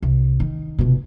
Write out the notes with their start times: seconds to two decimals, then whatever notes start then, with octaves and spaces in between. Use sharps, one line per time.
0.02 C2
0.40 D#3
0.78 F1 B2